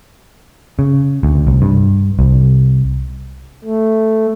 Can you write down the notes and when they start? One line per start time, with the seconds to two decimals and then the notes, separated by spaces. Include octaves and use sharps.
0.79 C#3
1.23 D2
1.47 C2
1.62 G2
2.19 C2
3.64 A3